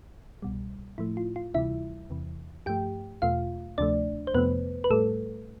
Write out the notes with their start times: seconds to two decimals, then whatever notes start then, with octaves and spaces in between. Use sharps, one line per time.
0.42 C2 B2 G3
0.98 A2 F3 A3 E4
1.17 F4
1.36 F4
1.54 D2 C3 E3 G3 E4 E5
2.10 E2 C3 E3
2.66 G2 F3 A3 G4 G5
3.22 E2 B2 A3 F4 F5
3.78 D2 C3 F3 A3 D4 D5
4.27 C5
4.34 F2 C3 F3 A3 B3 B4
4.84 B4
4.90 A2 G3 A3 A4